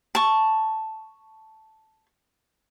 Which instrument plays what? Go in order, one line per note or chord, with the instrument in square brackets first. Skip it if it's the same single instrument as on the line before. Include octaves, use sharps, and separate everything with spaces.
[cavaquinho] A5 C#6